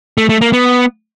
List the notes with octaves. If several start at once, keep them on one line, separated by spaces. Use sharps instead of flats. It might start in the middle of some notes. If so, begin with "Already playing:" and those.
A3
A3
A#3
B3